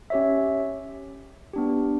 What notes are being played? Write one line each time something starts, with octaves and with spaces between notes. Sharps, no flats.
C#4 G4 C#5 E5
B3 D4 G4